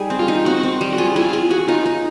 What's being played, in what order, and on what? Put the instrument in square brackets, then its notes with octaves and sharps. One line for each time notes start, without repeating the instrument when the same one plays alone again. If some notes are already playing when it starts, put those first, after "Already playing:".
Already playing: [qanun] G3 D#4 G#4
C4
[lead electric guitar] F4
[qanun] D#4
[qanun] C4 [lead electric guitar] F#4
[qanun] C4
G3
[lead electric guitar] F#4
[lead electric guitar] F4 [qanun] G#4
[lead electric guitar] E4 [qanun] G#4
[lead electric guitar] F4
[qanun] G#4
[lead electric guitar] F#4 [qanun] G#4
[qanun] D#4 [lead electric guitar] F4
[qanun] D#4